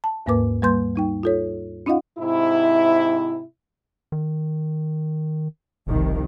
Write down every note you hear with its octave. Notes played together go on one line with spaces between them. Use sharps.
A5
D#2 G#2 A#3 A#4 B4 D6
G3 A#3 B4 C6 G6
G3 D#4 G5
F4 A4 C#5
C#4 D#4 F4 D#5 F5 F#5
G#2 C3 E4
D#3
F#1 C2 F2 D#3